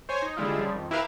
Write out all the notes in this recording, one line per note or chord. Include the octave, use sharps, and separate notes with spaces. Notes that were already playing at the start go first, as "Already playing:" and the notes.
C5 C#5 G#5
D#4
A#1 D3 G3 G#3 E4 F4
C#3 F3 G3
F2 D#3
E4 G4 A#4 B4 E5 F5